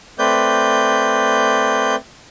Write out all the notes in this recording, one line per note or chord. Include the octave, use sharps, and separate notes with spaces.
A3 C4 B4 D5 G6